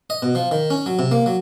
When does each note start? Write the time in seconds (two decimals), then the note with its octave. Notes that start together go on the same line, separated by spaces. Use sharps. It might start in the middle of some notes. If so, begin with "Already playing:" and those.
0.10 D#5
0.22 B2
0.35 F3
0.51 D#3
0.70 C#4
0.86 F#3
0.99 C3
1.11 A#3
1.26 F#3